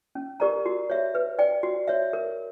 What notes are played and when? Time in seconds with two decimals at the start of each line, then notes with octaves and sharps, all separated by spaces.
0.15 C#4
0.40 G4 A#4 D5 A#5
0.66 F#4
0.90 C#5 E5
1.15 B4
1.39 D5 G5
1.63 F#4
1.88 C#5 E5
2.13 A#4